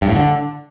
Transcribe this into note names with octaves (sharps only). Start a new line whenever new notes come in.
G2
A2
D3